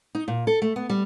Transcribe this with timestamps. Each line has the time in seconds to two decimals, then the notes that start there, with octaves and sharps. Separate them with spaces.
0.15 D#4
0.28 A#2
0.47 A4
0.62 A3
0.76 B3
0.89 G3